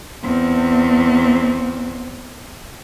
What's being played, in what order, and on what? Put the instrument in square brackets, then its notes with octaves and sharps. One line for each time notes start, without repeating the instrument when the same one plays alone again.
[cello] E2 C4